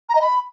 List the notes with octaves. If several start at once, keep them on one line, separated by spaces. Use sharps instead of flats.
A#5
D#5
B5